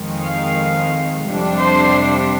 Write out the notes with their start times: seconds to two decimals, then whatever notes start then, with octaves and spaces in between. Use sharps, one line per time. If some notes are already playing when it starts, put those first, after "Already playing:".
Already playing: F2 D#3 G#3
0.24 F5
1.26 F2 C3 G3 D4
1.60 C5